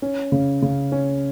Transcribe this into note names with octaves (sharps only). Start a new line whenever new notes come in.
C#4
C#3
C#3
C#4